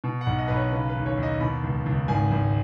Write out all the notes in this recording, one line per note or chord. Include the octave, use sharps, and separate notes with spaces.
B2
F#5
B1
D#5
B1 B4
C#5
C#3 B4
B4
D#2
C#5
D#2
D#5
B2 B5
C#2
C#2
G#1 G#5
G#1